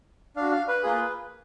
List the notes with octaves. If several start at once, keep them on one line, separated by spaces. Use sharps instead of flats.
D4 F#4 F5
F5
B4
A#3 F4 G#4